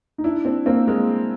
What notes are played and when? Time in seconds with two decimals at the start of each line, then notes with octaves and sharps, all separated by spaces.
0.18 D#4
0.24 D4 E4
0.45 C4 D4
0.66 A#3 C4
0.87 G#3 A#3